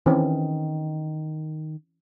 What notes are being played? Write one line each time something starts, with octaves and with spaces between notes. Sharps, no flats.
D#3 E3 C4 C#4